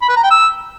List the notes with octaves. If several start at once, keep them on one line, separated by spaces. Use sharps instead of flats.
B5
B4
A#5
G5
E6